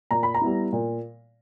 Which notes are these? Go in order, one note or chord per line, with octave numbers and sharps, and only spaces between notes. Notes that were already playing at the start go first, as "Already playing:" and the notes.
A#2 A#5
B5
A#5
G3 B3 E4
A#2